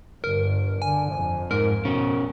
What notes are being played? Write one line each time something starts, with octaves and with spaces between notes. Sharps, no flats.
G1 G2 A#4
D3 G#5
F2
G#2 A#4
B2 C#4